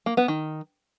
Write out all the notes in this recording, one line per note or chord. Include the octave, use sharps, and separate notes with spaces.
A#3
B3
D#3